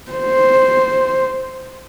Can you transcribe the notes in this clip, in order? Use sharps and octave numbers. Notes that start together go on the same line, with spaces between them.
C5